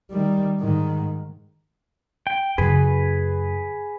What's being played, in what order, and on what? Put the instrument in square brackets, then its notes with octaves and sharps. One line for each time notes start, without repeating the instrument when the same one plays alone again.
[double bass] D#3 G3
G#2 D#3
[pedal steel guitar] G5
[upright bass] F#2 C#3 [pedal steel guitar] G#4 B4